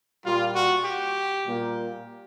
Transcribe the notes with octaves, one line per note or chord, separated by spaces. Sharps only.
A#2 G3 A#3 F4
F#4
G4
A#2 G3 A#3